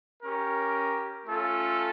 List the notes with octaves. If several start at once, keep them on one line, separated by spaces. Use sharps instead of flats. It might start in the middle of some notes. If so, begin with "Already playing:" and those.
C#4 G4 A#4
A3 C#4 F4 A4